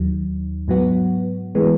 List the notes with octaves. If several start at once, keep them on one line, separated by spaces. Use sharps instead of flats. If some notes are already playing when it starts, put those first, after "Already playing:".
Already playing: D#2 D#3 F#3
G#2 F#3 B3 F#4
E3 G#3 B3